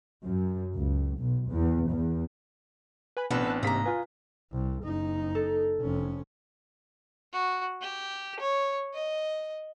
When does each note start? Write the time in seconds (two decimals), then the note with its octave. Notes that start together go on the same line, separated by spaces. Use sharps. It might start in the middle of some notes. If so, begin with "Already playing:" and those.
0.24 F#2
0.75 C#2
1.18 B1
1.49 E2
1.88 E2
3.17 B4 G#5 B5
3.30 A1 B2 B3 C4 D4 A4 B4 F#6
3.47 A5 F#6
3.63 G#2 C3 A#3 D#5 A#5 B6
3.86 F4 B4 F5 G#5
4.52 C2
4.84 F#1 D#4
5.35 A4
5.81 F1 C#4
7.33 F#4
7.82 G4
8.40 C#5
8.94 D#5